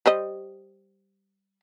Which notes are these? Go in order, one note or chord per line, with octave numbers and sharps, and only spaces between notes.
G3 C5 D#5